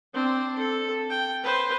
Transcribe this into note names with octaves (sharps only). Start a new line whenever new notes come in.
C4 D4
A4
G5
B4 C5